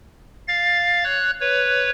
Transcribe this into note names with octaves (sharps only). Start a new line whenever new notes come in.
F5 A6
C#5 F#6
B4 C#5